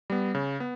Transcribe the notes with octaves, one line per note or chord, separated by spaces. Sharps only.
G3 B3
C#3
B3